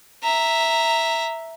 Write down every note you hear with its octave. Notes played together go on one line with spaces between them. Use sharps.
E5 A#5